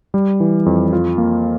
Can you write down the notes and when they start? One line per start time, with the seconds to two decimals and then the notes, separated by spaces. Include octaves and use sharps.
0.14 G3
0.40 E3
0.66 F2
0.93 F4
1.18 A#3